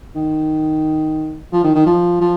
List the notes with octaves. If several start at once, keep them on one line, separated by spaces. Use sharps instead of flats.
D#3
F3
D#3
D#3
F3
F3